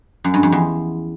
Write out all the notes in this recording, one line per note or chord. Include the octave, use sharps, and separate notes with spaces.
F#2
G2
F2
E2